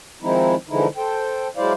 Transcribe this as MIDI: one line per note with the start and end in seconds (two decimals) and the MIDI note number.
0.22 0.55 51
0.22 0.55 53
0.22 0.55 56
0.22 0.55 60
0.22 0.55 63
0.22 0.55 64
0.69 0.87 50
0.69 0.87 52
0.69 0.87 53
0.69 0.87 56
0.69 0.87 63
0.69 0.87 64
0.97 1.48 69
0.97 1.48 72
0.97 1.48 79
1.57 1.73 54
1.57 1.73 56
1.57 1.73 64
1.57 1.73 72
1.57 1.73 74
1.57 1.73 77